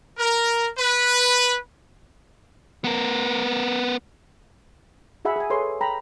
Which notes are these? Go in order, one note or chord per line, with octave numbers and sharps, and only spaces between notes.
A#4
B4
B3 A#4
F#4 G#4 E5 F#5 B5
G#4 G#5
G#4 A4 B4 C#5 C6
G5 A#5 B5